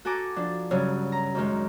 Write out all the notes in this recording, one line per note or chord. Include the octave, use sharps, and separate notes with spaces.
F#4 A4 G#5 A#5 D6
F3 D4
G2 C#3 F#3
A#5
F#2 D#3 G#3